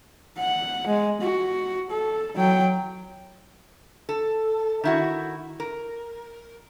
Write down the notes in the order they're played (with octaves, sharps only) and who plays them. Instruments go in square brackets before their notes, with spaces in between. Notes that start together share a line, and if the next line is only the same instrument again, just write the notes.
[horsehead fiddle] F#5
G#3
F#4
A4
F#3 G5
[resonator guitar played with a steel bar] A4
D#3 E4 F#4
A#4